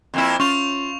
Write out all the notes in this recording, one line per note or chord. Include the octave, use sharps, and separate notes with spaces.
F2 A#3 E4
C#4 F4 C#6 F7